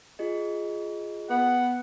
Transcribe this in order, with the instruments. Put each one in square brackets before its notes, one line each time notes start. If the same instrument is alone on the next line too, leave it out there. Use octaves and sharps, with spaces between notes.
[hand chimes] F4 G#4 D#5
[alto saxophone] B3 [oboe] F#5